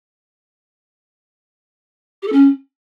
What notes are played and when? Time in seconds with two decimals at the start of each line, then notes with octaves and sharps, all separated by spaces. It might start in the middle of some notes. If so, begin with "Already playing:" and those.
2.22 G4
2.27 A4
2.32 C#4